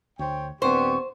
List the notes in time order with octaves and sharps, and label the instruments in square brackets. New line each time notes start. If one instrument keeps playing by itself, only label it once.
[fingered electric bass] D2 [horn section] C5 C#5 G5
[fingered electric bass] D#1 C4 [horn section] B3 D4 G4 [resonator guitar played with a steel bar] C5 [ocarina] C#6